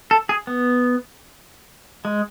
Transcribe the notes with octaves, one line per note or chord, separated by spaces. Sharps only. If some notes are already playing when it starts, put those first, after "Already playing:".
A4
G#4
B3
G#3